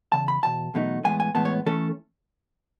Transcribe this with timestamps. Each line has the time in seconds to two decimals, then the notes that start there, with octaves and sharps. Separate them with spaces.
0.12 E2 C#3 A5
0.28 B5
0.43 E2 B2 A5
0.74 E2 B2 F#3 A3 D#4
1.04 A2 E3 G#3 B3 G#5
1.20 G#5
1.35 A2 E3 G#3 B3 A5
1.45 C#5
1.66 E3 A3 C#4 A4